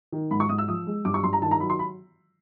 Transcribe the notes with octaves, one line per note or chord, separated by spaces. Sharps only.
D#3
G#2 B5
C#6
G#2 D#6
E6
F3 D#6
G#3
G2 D6
C#6
G2 C6
A#5
D#3 A5
A#5
F#3 B5
C6
B5